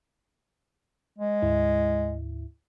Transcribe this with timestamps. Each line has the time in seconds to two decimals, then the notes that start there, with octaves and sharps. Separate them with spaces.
1.18 G#3
1.42 D2 G#2 E4